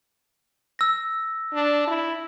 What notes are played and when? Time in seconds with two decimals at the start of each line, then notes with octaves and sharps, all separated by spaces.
0.79 E6 A#6
1.53 D4
1.87 E4